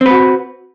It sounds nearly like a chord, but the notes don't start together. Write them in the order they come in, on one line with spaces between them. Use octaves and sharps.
C4 B4 F#4